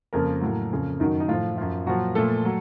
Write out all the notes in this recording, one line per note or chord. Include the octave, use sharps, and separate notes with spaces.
F2 C#3 F3 A#3 A#4
A2 F#3
F2 C#3 F3
F#2 D#3 F#3 D#4
D#4
A2 F3 F4
F#2 F3 F4
A#2 F3 F#3 F#4
A#2 F3 A3 A4
F#3